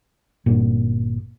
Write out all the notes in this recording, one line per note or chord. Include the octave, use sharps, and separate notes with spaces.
G1 A#2